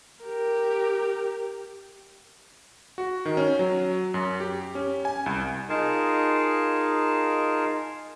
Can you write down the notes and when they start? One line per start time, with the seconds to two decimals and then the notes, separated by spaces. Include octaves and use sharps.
0.23 G4 A#4
2.98 F#4
3.25 D#3
3.37 C#4
3.59 F#3
4.14 F#2
4.40 G4
4.75 C#4
5.05 G#5
5.26 C2
5.69 D#4 F4 G#4 A#4 F5 A5